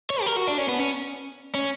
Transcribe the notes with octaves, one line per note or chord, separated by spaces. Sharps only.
C#5
G4
A#4
F#4
D4
C#4
B3
C#4
C#4